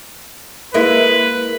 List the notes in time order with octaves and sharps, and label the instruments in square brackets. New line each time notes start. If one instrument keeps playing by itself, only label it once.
[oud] G#3 A#3 E4 [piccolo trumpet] B4